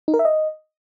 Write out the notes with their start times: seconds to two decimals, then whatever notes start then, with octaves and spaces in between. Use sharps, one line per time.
0.08 D#4
0.14 A#4
0.19 E5
0.25 D#5